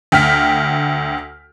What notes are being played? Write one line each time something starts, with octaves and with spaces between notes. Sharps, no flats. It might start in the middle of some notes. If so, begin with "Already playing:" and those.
D2 G5 F6 B6